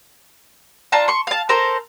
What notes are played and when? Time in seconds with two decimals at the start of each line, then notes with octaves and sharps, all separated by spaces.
0.92 D4 F4 A5 A#5
1.08 C6 C#6
1.27 F5 A5
1.49 A4 A#4 C5 A#5